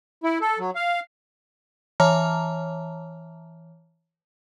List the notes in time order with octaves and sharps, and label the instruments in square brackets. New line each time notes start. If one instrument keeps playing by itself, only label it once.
[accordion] E4
A4
F#3
F5
[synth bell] E3 C#5 E5 A5 A#5 F6